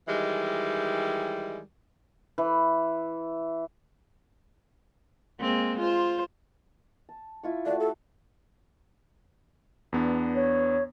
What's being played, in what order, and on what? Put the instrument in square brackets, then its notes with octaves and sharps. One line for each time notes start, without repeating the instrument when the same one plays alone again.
[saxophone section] D#3 E3 G3 G#3
[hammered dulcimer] E3
[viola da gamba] G#3 A#3 C4
F4 C5
[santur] A5
E4 F4 C#6
[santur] A3 F#4 [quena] D5
[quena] A4
[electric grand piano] E2 B3 D4
[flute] C#5